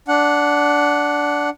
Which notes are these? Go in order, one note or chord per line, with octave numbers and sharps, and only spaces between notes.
D4 F#5